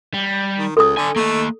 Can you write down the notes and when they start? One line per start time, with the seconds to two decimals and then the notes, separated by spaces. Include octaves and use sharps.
0.14 G3
0.57 D#3
0.77 C#2 A4 D#6
0.97 D3 D4 G#5
1.16 A3 A#3 D#5